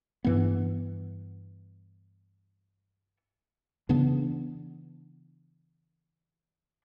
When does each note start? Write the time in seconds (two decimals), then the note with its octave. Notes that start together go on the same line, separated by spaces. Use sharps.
0.24 G2 E3 B3
3.89 C#3 E3 B3 D4